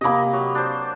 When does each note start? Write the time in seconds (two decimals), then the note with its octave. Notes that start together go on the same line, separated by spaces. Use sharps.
0.01 C3 A#3 D#5 B5
0.33 F#3
0.55 D4 C5